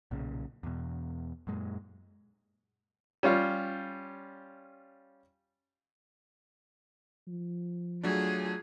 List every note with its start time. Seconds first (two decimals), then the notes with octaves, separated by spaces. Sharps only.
0.11 B1 A#2 C#3
0.63 E2 B2
1.47 F#2 A#2 G#3
3.23 G3 C#4 F4
7.27 F3
8.03 F#3 A3 D4 F4 G#4